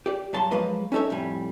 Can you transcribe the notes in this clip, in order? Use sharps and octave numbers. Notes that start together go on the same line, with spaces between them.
G4 D5
G2 F#3 A5 C6
F3 F#3 G#3 A#3 B4 D#5
C#4 D#4 A4 C#5 E5
F2 A2 G3 G#5